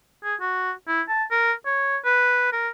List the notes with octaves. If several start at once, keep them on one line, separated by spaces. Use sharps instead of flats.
G#4
F#4
E4
A5
A#4
C#5
B4
A#4